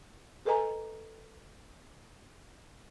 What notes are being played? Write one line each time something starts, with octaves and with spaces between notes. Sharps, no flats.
G#4 A4 B4 D#5 G#5 A#5